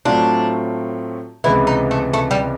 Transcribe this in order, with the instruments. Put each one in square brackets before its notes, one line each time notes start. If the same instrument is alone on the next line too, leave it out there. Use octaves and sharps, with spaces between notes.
[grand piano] A2 F#3 A3 C4 F4 [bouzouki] D4
[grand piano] C#2 C3 E3 G#3 B3 [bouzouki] E4
[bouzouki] D#4
A3
A3
G3